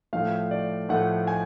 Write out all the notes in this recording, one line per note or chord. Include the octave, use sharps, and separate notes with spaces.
A2 F3 A3 F5
D5
A2 F3 A3 F#5
G#5